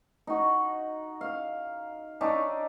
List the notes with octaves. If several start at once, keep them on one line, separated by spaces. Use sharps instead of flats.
D#4 F#4
F5
D4 D#4 C#5 E5